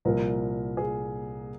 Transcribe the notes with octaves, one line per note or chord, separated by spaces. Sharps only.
C2 A#2 F3 A#4
G#4